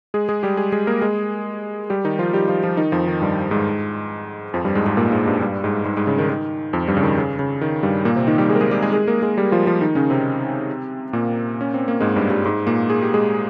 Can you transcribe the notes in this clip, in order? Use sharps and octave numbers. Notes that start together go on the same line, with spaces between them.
G#3 G#4
G#3 G#4
G3 G4
G#3 G#4
G#3 G#4
A#3 A#4
G#3 G#4
G3 G4
D#3 D#4
F3 F4
G3 G4
F3 F4
F3 F4
D#3 D#4
F2 F3
D#3
G2 G3
G#2 G#3
F2 F3
G2 G3
G#2 G#3
G#2 G#3
A#2 A#3
G#2 G#3
G2 G3
G2 G3
G#2 G#3
G#2 G#3
G#2 G#3
C#3
D#3
D#3
F2 F3
G2 G3
C#3
D#3
C#3
C#3
D#3
G2 G3
A#2 A#3
C3 C4
D#3 D#4
G3 G4
G#3 G#4
A#4
G#3 G#4
G3 G4
G#3 G#4
G#3 G#4
A#3 A#4
G#3 G#4
G3 G4
F3 F4
F3 F4
D#3 D#4
C#3 C#4
C3 C4
A#2 A#3
C#4
C4
A#3
G#2 G#3
G2 G3
G2 G3
G#2 G#3
A#2 A#3
G#4
G4
G#3 G#4